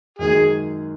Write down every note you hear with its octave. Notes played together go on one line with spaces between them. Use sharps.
F#2 D#3 G#3 G#4